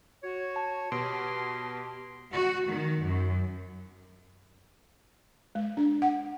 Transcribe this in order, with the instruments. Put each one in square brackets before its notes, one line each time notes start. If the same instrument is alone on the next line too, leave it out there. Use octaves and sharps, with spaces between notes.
[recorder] F#4 [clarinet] C#5
[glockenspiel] A5
[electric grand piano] B2 [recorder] G4 [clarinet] C6 [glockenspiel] D7
[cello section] F#4
D#3
F#2
[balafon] G#3
D4
F#5